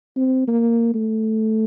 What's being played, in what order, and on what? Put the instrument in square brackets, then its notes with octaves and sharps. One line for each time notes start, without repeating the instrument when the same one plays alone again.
[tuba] C4
A#3
A3